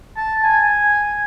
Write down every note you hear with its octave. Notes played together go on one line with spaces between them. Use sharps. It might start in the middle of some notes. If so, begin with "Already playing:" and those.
A5
G#5